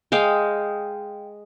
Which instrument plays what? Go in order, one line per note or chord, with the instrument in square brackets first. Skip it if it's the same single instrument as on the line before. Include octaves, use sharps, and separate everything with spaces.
[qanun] G#3 F5 G5